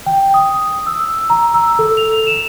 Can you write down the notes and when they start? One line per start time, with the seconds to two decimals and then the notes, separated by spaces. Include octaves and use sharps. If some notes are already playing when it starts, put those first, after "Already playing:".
0.06 G5
0.34 D#6
0.87 E6
1.30 A#5
1.54 E6
1.79 A4
1.97 F7
2.27 E7